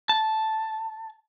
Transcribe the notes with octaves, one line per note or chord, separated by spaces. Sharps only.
A5